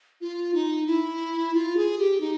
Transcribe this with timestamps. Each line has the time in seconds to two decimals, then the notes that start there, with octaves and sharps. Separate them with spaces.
0.21 F4
0.54 D#4
0.87 E4
1.54 F4
1.77 G#4
1.99 G4
2.21 D#4